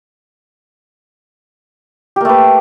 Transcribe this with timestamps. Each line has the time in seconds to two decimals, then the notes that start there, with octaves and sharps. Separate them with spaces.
2.16 G4
2.21 A#3
2.25 A3
2.29 B4